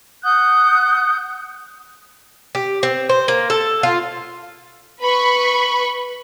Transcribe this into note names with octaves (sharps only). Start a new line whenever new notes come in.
F#5 D#6 F#6 G6
G4
C4
C5
A#3
A4
F4
B4 B5 C#6